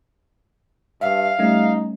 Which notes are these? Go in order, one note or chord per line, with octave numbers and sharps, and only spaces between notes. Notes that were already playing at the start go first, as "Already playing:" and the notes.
G2 E5 F5
G3 A3 C#4 D#4